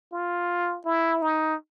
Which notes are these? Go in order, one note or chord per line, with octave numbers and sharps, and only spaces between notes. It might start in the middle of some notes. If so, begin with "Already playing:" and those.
F4
E4
D#4